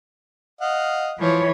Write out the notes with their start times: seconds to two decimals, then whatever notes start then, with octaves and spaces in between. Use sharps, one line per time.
0.61 D#5 F5 F#5
1.19 E3 F3 C#5